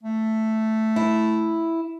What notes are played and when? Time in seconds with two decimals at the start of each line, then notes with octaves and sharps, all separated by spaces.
0.03 A3
0.96 E4